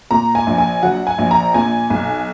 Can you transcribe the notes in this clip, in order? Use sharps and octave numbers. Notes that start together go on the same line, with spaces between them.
A#2 A#5
G#5
A#1
G#5
F#3 F#5
G#5
A#1
A#5
A#2 G#5
B1 G#5